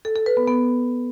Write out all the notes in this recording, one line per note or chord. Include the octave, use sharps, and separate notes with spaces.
A4
A4
B4
B3
B3